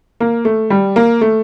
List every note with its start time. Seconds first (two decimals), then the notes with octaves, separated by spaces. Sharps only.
0.20 A#3
0.45 A3
0.70 G3
0.96 A#3
1.21 A3